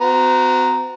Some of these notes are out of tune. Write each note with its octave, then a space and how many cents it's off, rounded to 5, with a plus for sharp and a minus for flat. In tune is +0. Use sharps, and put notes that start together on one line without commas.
C4 -40 F#4 -5 A#5 +0